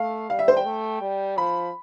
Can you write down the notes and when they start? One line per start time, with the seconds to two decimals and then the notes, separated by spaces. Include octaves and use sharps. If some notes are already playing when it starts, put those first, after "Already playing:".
Already playing: A3 F5
0.29 G3 F5
0.39 E5
0.48 C5
0.57 G5
0.65 A3
1.01 G3
1.37 F3 B5